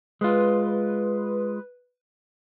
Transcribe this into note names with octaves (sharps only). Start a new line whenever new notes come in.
G#3 F4 B4